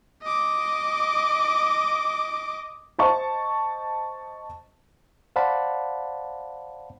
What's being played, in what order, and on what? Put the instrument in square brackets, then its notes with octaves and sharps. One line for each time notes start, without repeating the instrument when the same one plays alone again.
[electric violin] D#5 D6
[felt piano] C5 D#5 A5 C#6
[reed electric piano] C5 D5 F5 F#5 A5 B5